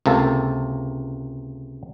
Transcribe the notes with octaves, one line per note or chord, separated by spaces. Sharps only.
C#2 C3 A#3 A4